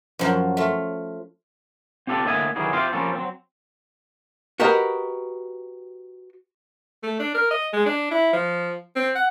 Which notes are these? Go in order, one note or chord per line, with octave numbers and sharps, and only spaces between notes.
F#2 F3 F#3
A3 F4
C4 F4 G4 A4 D5
A2 D3 A#3 D#5 E5 G#5
D#3 E3 F#3 G3 G#4
C4 F4 G4 C5 E5 F5
F3 G3 A#3 C4 C#4 A4
F#3 C4
F#4 G4 A#4 B4 D#5
A3
D4
A#4
D#5
G#3
D4
E4
F3
C4
F#5